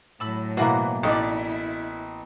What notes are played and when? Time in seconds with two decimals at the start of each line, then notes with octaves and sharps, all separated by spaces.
0.20 A2 F#3 A5 B5 E6
0.57 B2 E3 A#3 F#4 C5 F#5
1.03 A1 D#4 E4 C#5 D5